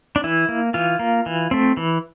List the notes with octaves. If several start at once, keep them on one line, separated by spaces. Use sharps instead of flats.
D4
E3 E4
A#3
E3 F4
A#3
E3
A3 C4
E3